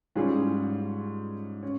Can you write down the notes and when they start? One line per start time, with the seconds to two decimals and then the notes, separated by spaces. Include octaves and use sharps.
0.15 G#2 G3 C#4 F4 G#4
1.63 C#4